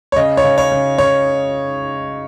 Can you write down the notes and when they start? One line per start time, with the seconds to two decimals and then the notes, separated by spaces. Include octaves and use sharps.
0.12 C#5
0.16 C#3 D#5
0.37 C#5
0.44 C#3
0.58 C#5
0.72 C#3
0.98 C#3 C#5